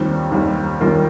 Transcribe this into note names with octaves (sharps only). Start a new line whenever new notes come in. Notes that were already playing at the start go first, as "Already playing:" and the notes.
Already playing: D#2 D#3 G3 C4 F4
D#2 D#3 G3
D#2 D#3 G3 F4 A#4